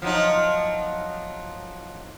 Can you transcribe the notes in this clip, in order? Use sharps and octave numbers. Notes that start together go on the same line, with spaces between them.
F3 F#3 D#4